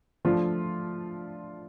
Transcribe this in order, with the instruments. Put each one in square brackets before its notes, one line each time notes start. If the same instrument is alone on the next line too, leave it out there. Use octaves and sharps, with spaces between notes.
[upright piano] F3 A3 D4 F4